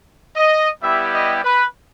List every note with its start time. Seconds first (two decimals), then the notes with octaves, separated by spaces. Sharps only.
0.36 D#5
0.83 G3 B3 E4 G4 E5
1.14 D#5
1.45 B4